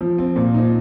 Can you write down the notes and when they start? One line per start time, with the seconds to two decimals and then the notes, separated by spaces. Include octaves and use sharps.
0.01 F3
0.18 C4
0.36 A#2
0.54 D#4